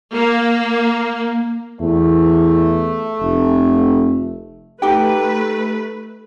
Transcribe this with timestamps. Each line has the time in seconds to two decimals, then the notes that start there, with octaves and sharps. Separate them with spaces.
0.13 A#3
1.81 E2 A3
3.21 F1
4.82 A3 D#4 G4 B4 G5